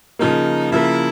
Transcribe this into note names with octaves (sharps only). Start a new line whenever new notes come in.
C#3 F3 A#3 D#4
C#3 F3 A#3 E4